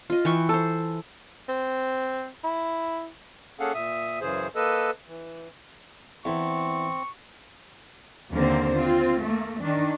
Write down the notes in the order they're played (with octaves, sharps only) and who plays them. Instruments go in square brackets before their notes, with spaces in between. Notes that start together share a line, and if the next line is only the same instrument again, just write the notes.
[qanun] F4 D#5
E3 G5 C#6
A4 C5
[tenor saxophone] C4
E4
[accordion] A#3 C#4 G#4 A4 F5 F#5
A#2 E5 D#6
F#2 C#3 E3 G#4 C5
A#3 A4 B4 D#5 E6
E3
[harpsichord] E2 [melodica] C4 [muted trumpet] C#6
[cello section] D#2 D3 A#3 C4 C5
C4 F4
A3 A#3
D#3 D4